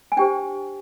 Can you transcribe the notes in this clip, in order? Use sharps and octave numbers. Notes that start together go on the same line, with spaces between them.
G#5
D4 G4 C5 G5